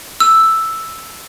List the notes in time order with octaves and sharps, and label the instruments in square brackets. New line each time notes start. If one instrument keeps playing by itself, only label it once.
[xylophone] E6